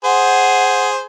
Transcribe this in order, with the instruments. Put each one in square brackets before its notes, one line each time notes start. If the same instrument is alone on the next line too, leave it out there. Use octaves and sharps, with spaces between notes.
[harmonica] G#4 C5 [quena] F#5